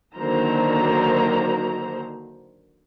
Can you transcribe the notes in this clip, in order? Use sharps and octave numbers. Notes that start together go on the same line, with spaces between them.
D3 D#3 F#3 A#3 C5 A#5